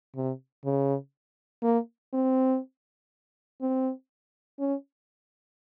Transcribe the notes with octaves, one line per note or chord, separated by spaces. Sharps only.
C3
C#3
A#3
C4
C4
C#4